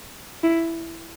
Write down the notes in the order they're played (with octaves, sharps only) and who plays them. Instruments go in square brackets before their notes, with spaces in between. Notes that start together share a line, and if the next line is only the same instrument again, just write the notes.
[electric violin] E4